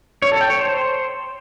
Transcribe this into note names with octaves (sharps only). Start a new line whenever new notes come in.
C#5
A4
G5
C#5
C5